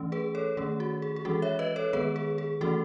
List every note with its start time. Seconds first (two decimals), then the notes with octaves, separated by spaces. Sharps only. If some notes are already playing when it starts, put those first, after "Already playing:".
Already playing: E3 A3 C#4
0.12 G#4 B4
0.35 A4 C#5
0.57 D#3 A3 C#4 G#4
0.80 F#4
1.02 G#4
1.16 G#4
1.25 E3 G#3 C#4 F#4 A4
1.42 C#5 E5
1.59 B4 D#5
1.76 A4 C#5
1.93 D#3 G#3 B3 G#4 B4
2.16 G#4
2.38 G#4
2.61 E3 A3 C#4 F#4 A4